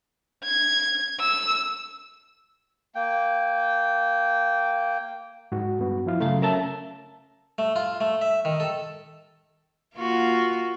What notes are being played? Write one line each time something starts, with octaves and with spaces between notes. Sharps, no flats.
G#6
E6
A#3 G5
G#2 F#4
G2 B3 F#4
F3 E4 F5
F#2 C#3 A3 F5
C#4 A#4 E5 A5
A3
F4
A3
E5
D#3
A4
A#3 F4 F#4